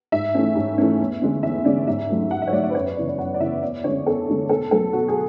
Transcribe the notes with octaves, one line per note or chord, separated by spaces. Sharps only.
G#2 E5
E3 A3 C#4
G#2
E3 A3 C#4
E2
D3 G#3 C#4
E2 E5
D3 G#3 C#4 D5
G#2 E5
F#3 A3
G#2 F#5
E5
C#5
F#3 A3 D5
E5
B4
F#2 C#5
B4
C#3 E3 B3 D5
D5
F#2 F#5
D5
C#3 E3 B3 E5
E2 D5
D3 G#3 C#4 C#5
E2 A4
D3 G#3 C#4
B2 A4
F#3 B3 A4
B2 F#4
G#4